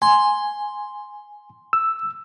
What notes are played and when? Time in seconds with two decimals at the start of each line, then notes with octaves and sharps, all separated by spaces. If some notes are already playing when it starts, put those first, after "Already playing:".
0.02 G#5 C6
1.73 E6